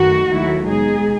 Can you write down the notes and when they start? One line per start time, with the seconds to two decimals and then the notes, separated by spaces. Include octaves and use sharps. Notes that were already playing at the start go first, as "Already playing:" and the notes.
Already playing: F#2 D#3 A3 F#4
0.28 D#2 D#3 F#3 A3 E4
0.67 B2 G#3 D#4 G#4